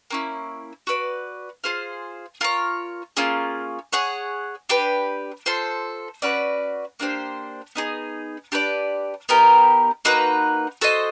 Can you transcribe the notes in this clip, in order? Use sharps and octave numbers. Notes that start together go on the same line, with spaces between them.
A#3 C#4 E4
F#4 B4 D5
F4 G#4 C5 F5
F4 A#4 C#5
A#3 C#4 F4 G#4
G#4 C#5 F#5
D4 G4 B4
F4 A4 C5
C#4 F#4 B4 D5
A#3 D4 G4 C5
B3 D#4 G#4
D4 G4 B4 D5
B3 D#4 G4 A#4
A#3 D#4 F#4 B4
F#4 A4 C5 D#5